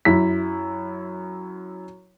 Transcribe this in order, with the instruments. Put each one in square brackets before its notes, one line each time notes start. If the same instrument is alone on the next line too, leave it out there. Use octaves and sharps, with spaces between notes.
[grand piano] F#2 E4 B6